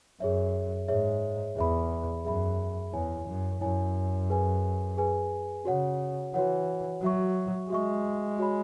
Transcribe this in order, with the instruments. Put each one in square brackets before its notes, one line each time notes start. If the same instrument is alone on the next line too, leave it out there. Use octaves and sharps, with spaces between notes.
[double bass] F#2 [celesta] G#4 C#5 E5
[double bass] G#2 [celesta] G#4 C#5 E5
[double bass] E2 [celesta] G#4 E5 B5
[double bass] F#2 [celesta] G#4 E5 B5
[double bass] E2 [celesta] E4 C#5 G#5
[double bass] F#2
[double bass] F#2 [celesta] E4 C#5 G#5
[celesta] G#4 B4 G#5
G#4 B4 G#5
[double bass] C#3 [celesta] F#4 C#5 F#5
[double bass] E3 [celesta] F#4 C#5 F#5
[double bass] F#3 [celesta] F#4 E5 C#6
[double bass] G#3 [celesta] F#4 E5 C#6
[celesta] F#4 C#5 G#5 B5